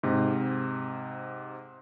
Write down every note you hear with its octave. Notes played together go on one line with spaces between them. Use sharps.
G#2 C3